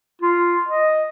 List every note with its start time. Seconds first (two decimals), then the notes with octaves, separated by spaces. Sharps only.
0.22 F4
0.69 D#5